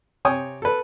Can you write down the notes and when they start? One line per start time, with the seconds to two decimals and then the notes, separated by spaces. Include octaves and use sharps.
0.25 C3 C#5 G5 G#5 D#6
0.62 A4 B4